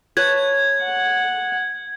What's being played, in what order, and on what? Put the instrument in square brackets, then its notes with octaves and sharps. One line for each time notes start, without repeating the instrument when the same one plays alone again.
[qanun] B4 C#5 A5 [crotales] G#6
[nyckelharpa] F#5